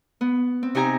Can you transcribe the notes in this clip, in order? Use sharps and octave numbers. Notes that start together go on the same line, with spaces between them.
B3
C4
C3 D#4 G4 G#5 A#5